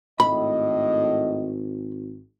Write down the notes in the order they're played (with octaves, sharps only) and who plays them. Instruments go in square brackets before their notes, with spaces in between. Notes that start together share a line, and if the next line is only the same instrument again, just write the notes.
[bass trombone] G#1 [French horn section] A2 D#5 [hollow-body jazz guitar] B5